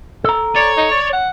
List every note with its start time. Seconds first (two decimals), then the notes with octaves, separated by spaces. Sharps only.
0.24 A4 A#5
0.56 C#5 D5
0.77 D#4
0.91 D5
1.13 F#5